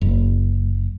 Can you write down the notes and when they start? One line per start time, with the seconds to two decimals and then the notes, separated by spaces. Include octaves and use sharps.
0.01 F#1